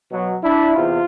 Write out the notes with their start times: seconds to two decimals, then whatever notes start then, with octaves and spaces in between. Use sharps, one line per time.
0.12 B2 F#3
0.44 D4 E4
0.76 E2 C3 F4